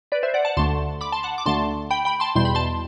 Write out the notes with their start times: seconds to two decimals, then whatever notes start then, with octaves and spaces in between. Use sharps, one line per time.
0.12 B4 D5
0.23 C5 E5
0.34 D5 F#5
0.45 F#5 A5
0.57 D2 D3 A3 A5 C6
1.01 B5 D6
1.12 A5 C6
1.23 F#5 A5
1.38 D6
1.46 D2 D3 A3 A5 C6
1.90 G5 B5
2.05 G5 B5
2.20 A5 C6
2.35 E2 B2 G3 C6
2.45 B5
2.55 A5 C6